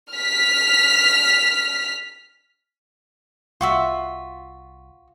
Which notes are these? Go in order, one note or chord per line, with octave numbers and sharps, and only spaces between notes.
F6 B6
C2 F4 F#4 E5